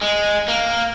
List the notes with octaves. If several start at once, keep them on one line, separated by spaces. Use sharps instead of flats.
G#3
A#3